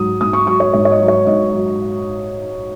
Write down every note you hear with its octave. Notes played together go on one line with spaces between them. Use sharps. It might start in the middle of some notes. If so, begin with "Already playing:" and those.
Already playing: G#2 F#3 D#6
G#2 D#6
C#6
F#3 C#6
C#5
G#2 C#5
C#5
D#5
F#3
C#5
G#2 D#5
F#3